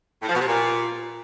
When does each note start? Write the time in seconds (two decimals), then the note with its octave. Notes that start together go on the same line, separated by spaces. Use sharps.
0.22 A2
0.28 F3
0.34 B2
0.41 C3
0.47 A#2